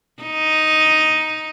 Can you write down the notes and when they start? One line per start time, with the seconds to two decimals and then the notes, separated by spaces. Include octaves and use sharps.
0.22 D#4